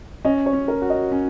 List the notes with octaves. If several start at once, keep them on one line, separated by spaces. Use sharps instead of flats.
C#4 D#5
C#5
C#4
A#4
F#4
D#5
C#4